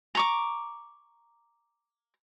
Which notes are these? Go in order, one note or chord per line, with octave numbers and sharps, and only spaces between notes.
A#5 C#6 D6